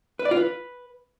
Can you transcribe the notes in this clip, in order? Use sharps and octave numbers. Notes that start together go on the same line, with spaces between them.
B4
D5
F4
B4